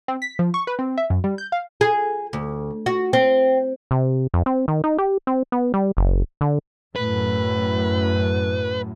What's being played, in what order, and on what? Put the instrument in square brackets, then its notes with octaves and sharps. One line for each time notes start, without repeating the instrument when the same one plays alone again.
[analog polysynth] C4
B6
F3
C#6
B4
C4
E5
F#2
G3
G6
F5
[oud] G#4
D2
F#4
C4
[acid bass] C3
F2
C4
D#3
D#4
G4
C4
B3
G3
F#1
D3
[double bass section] F#2 A2 [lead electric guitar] B4